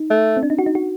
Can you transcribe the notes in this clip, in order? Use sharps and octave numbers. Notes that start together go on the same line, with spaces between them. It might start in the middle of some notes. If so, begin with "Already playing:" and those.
Already playing: D#4
A3
C4
D4
D#4
F#4
D#4
F#4